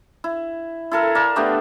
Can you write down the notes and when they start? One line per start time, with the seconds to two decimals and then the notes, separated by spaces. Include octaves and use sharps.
0.24 E4
0.91 E4 A4 A#4
1.15 A#4 D5 F5 A5
1.36 A3 B3 D4 G4